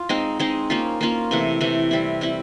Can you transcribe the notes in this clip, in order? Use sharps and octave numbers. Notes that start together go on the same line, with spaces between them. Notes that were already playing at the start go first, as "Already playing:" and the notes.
Already playing: F4
G#3 C4 D#4
G#3 C4 D#4
A#3 C#4 F4
A#3 C#4 F4
C3 E3 A3
C3 E3 A3
G3 C4 E4
G3 C4 E4